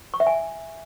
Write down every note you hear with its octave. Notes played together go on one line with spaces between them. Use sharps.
C#6
E5
G#5